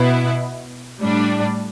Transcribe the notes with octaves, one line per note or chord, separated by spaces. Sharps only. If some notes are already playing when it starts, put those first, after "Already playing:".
Already playing: B2 B3 E4
A2 G3 D4